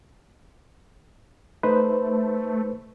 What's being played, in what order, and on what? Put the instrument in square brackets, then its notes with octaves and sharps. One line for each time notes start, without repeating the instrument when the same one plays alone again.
[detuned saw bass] A3 [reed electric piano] D#4 B4 C5